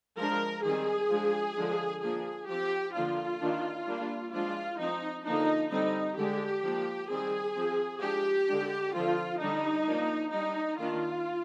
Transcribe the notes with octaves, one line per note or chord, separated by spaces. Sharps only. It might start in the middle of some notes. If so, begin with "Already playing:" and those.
F3 G#3 D4 A#4
D#3 G3 C4 G#4
F3 G#3 D4
D3 F3 G#3 D4
F3 A#3 D4 G#4
F3 C4 G4
D3 F3 A#3 D4 F4
D#3 A#3 D4
G3 A#3 D4
F3 G#3 D4 F4
F3 C4 D#4
D3 F3 A#3 D4 D#4
D3 G3 C4 D#4
D3 G#3 D4 G4
F3 A#3 D4
D#3 G3 C4 G#4
F3 C4
F3 G#3 D4 G4
D3 G#3 D4
D3 F3 C4 F4
D3 G3 D4 D#4
F3 A#3 D4
G3 D4 D#4
D#3 A#3 D4 F4